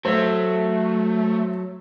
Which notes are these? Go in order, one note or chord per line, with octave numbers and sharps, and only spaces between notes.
F#3 A3 C5 E5